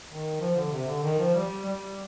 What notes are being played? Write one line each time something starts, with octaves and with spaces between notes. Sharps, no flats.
D#3
F3
D3
C3
D3
D#3
F3
G3
G3